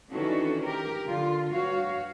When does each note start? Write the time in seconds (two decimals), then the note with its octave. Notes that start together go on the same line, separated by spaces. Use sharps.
0.12 D#3 E3 C#4 D4 F#4 A4
0.62 G4 A#4
1.07 D3 F4
1.52 G2 F#4 C#5 F5